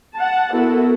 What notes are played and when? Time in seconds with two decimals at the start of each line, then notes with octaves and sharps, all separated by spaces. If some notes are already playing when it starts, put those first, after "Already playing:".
0.15 F#5 A5
0.51 B3 E4 F#4 A4 A#4